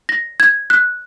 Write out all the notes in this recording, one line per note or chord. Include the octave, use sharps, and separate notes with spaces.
A#6
G#6
F#6